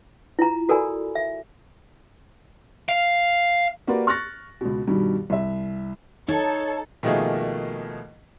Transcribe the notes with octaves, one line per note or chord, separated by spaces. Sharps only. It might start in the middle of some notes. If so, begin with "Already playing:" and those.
E4 F4 A#5
F#4 A4 A#4 D5 G#5 B5
E5
F5
A#3 F#4 G4 A#4 B4 D5
C#6 F6 F#6 A6 A#6
C#2 B2
G2 B2 D#3 G3
C2 E5
D#4 A4 C#5
B2 D#3 F3 A3 A#3 G#4